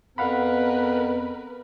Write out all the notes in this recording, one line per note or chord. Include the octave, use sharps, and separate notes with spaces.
F2 B3 A#4 B4 F5 F#5 B5